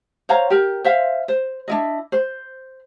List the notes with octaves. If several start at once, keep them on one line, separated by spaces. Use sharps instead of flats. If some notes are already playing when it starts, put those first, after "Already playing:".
C5 C#5 F5 A#5
G4 A#4
C5 E5 F5
C5
D4 E4 D#5
C5